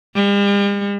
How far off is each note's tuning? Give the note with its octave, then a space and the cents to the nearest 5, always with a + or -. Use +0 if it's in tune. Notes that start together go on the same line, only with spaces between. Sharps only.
G3 +45